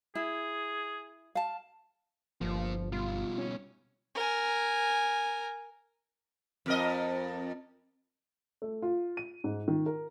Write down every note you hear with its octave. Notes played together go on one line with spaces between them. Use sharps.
E4 G#4
F5 A5
G1 F3 A#3 F4
B2 G3 F4
C#4
A#4 G#5
F2 A#4 D#5
A3
F4
D#7
G#2
D#3
A#4